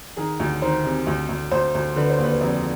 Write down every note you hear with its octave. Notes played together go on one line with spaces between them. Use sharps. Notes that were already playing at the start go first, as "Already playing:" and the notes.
D#3 G#4
D2
D#3 C5
C3
D2
D2
D2 C5
D2
D3 B4
C5
D#2
B4
F1